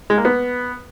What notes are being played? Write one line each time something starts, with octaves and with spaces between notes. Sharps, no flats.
G#3
A#3
B3